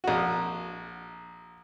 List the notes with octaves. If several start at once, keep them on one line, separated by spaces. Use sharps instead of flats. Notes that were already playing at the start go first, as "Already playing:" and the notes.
A#1 F#4